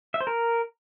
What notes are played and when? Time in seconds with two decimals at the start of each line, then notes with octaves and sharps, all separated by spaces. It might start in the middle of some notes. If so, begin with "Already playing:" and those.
0.14 E5
0.21 C5
0.27 A#4